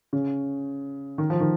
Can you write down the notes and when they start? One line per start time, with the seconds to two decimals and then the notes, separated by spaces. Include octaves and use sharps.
0.13 C#3
1.18 D#3
1.30 F3
1.40 D#3